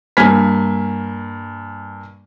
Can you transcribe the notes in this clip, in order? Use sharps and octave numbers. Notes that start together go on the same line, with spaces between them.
G2 A#3 G#5 F6 G#6 B6